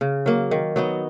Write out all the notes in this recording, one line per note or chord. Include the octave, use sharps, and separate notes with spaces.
C#3
F#3 A#3
D#3
F#3 B3 D#4